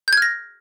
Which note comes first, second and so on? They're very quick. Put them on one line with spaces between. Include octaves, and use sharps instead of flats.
G6 G#6 F6 A#6